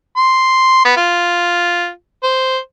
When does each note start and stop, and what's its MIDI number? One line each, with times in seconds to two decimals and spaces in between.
0.17 0.85 84
0.85 0.96 59
0.97 1.89 65
2.23 2.58 72